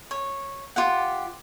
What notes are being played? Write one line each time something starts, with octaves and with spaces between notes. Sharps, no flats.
C#5
F4 G4 F#5